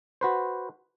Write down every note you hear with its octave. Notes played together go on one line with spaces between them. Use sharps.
F#4 B4 C5